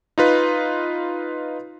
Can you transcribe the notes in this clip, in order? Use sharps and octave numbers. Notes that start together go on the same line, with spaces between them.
D#4 F4 B4